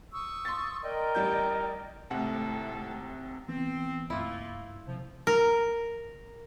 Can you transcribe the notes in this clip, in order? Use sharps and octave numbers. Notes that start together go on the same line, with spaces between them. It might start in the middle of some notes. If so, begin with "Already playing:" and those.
C#6 D#6 E6
C6 A6
A#4 D5 D#5 G5
A1 G3 G6
G#1 C3 G#3 A3 E4 A4 F#5
E3 B3 C4
C#2 G2 A3 A#3 E4 F4 E6
C3 F3
A#4